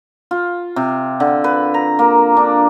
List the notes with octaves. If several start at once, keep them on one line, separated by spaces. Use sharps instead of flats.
F4
C3
D3
B4
A#5
A#3
D4